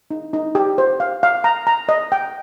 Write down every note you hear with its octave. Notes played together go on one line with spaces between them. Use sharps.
D#4
D#4
G4
C5
F5
F5
A#5
A#5
D#5
G5